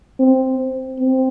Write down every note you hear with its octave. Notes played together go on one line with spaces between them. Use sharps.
C4
C4